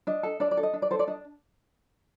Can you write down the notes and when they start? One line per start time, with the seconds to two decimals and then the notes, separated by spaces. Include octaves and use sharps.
0.07 D4 D#5
0.23 A4
0.40 D4 D5
0.51 D5
0.57 A4
0.63 D#5
0.73 D4
0.82 D5
0.91 A4 C5
0.99 D5
1.07 D4 D#5